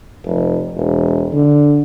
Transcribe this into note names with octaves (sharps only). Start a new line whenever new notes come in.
F1
E1
D3